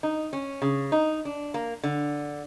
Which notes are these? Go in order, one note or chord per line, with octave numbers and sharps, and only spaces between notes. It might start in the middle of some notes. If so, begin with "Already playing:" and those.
D#4
C#4
C#3
D#4
D4
A#3
D3